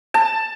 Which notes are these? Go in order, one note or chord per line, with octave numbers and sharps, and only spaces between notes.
A5